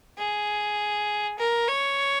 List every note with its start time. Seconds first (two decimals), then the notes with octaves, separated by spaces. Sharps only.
0.18 G#4
1.39 A#4
1.68 C#5